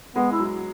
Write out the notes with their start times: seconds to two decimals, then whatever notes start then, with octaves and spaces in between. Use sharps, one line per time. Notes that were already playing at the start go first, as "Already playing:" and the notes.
0.16 G#3 B3
0.32 E4
0.40 F#3